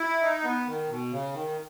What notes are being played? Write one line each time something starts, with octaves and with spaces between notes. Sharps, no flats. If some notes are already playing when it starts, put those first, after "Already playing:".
Already playing: E4
D#4
B3
D#3
B2
C#3
D#3